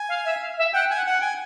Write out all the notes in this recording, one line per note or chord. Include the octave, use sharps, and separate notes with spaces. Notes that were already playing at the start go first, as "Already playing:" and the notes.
Already playing: G#5
F5
E5
F5
E5
F#5 G5
G#5
F#5
F#5
G5
G#5